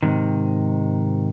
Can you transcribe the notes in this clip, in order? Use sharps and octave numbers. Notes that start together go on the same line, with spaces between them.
G#2 C3 D#3